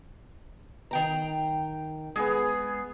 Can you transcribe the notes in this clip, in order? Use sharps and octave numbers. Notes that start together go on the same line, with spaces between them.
D#3 G5 A#5
G#3 B3 G#4